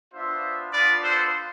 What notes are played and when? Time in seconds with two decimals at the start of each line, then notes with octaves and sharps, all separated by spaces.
0.13 B3 D4 F4 C5 E5
0.72 B3 D4 F4 B4 D5
1.03 A4 C5